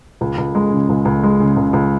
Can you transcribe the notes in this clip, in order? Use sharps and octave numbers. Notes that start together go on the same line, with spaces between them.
C#2
C#2
G#3
C#3
C#2
C#2
G#3
C#3
C#2
C#2